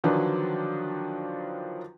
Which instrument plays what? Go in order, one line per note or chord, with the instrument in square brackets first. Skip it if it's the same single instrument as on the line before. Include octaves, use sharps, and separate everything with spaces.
[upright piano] D3 D#3 F3 F#3 D4 B4